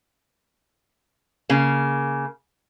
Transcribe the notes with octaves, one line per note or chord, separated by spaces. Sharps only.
C#3 A#3